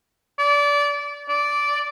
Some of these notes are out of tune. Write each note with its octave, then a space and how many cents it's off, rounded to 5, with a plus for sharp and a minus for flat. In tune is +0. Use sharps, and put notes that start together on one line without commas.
D5 -25
D5 -10